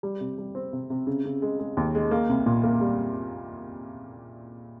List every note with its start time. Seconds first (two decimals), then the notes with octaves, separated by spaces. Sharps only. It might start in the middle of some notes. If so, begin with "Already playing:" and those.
0.03 G3
0.21 C3
0.38 G3
0.55 C4
0.73 C3
0.90 C3
1.07 C#3
1.25 C#3
1.42 G#3
1.59 G#3
1.77 D#2
1.95 G#3
2.11 A#3
2.29 C2
2.46 A#2
2.63 A#3
2.81 G3